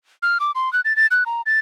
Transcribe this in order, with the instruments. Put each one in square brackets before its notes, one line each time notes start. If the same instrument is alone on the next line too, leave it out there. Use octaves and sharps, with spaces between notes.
[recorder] F6
D6
C6
F#6
A6
A6
F#6
A#5
A6